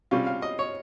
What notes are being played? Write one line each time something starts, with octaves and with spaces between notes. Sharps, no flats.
C3 G3 C#4 F4
F5
D#5
C#5